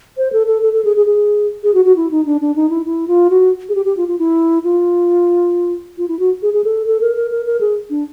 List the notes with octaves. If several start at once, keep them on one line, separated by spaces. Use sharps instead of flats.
C5
A4
A4
A4
A4
G#4
G#4
G#4
G#4
F#4
F#4
E4
D#4
D4
D4
D#4
E4
E4
F4
F#4
G#4
G4
G4
F4
F4
E4
F4
F4
E4
F#4
G#4
G#4
A4
A4
A#4
A#4
A#4
A#4
G#4
D4